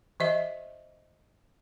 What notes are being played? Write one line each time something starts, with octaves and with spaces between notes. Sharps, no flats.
E3 D#5 E5